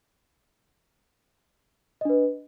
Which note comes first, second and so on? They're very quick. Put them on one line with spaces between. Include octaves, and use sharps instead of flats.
D#5 D4 B4